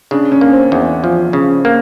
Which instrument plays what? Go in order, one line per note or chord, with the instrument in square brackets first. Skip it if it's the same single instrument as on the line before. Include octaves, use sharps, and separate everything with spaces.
[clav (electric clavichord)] C#3 [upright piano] D4
[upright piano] C#4
[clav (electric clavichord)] A#3
[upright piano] C4
[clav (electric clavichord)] E2
F3
C#3
A#3